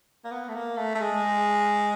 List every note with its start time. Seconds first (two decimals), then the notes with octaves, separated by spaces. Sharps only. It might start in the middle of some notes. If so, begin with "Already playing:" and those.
0.25 A#3
0.32 B3
0.49 A3
0.55 A#3
0.77 A3
0.95 A3
1.01 G#3